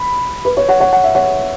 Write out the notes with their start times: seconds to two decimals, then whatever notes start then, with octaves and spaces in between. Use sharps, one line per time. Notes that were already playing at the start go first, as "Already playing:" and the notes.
Already playing: B5
0.45 B4
0.57 C#5
0.68 C#5 F#5
0.80 C#5 F#5
0.93 F#5
1.04 E5
1.15 C#5 F#5